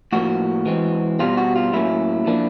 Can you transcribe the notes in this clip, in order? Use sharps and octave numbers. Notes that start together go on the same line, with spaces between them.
A2 F3 A#3 F#4
E3 G#3 C4
B2 G3 C4 F4
F#4
F4
A2 F#3 A#3 C#4 E4
A#2 F3 A#3 D4